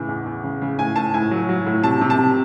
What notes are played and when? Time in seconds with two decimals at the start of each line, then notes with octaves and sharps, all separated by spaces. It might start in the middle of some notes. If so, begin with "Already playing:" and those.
Already playing: A2 C#3 E3
0.09 E2
0.26 E2
0.44 C#3
0.62 C#3
0.78 A2 G#5
0.96 A2 A5
1.14 A2 G#5
1.31 F#3
1.49 F#3
1.66 A2
1.84 C3 A5
2.01 C3
2.10 A5
2.19 C3